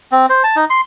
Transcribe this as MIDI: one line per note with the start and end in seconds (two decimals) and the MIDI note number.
0.12 0.26 60
0.30 0.43 72
0.44 0.56 81
0.56 0.65 63
0.70 0.81 84